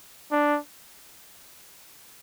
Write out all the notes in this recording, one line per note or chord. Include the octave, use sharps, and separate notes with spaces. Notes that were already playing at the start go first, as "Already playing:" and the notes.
D4